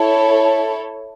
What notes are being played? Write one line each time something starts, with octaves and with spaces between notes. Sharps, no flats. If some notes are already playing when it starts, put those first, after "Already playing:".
Already playing: E4 A4 C#5